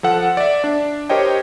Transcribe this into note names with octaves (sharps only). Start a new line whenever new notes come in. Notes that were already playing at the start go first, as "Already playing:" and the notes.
F3 A4 F#5
D5 E5
D4
G4 A#4 C5 C#5 D#5 G5